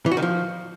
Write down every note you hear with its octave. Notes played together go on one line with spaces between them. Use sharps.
E3
F#4
D#3
F3